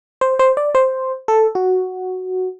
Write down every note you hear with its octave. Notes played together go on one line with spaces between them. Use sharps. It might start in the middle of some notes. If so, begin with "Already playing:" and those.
C5
C5
D5
C5
A4
F#4